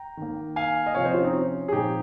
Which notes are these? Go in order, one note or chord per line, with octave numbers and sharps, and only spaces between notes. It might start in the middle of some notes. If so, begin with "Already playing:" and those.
Already playing: G5 A#5
D#3 A#3
F5 G#5
D#5
C3 F3 C4 C#5 F5
C5 D#5
C#4 F4
C4 D#4
C#4 F4
G#4
A#2 F3 G#3 C4 D#4 G4